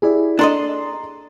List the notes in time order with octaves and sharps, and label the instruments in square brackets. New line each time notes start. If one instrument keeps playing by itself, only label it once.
[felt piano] E4 G4 [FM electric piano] G#4 D5
[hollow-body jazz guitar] D4 A4 D#5 [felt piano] A#5 C6